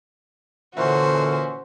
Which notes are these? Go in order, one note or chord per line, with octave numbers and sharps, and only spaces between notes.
A#2 D3 E3 C#4 F#4 C5